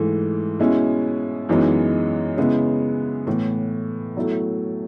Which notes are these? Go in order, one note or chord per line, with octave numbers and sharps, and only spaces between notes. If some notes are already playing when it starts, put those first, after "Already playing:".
Already playing: G#2 E3 A3
B2 G#3 C#4 E4
F#2 E3 G#3 B3 D#4
C#3 G#3 B3 E4
A2 E3 B3
B2 F#3 A3 E4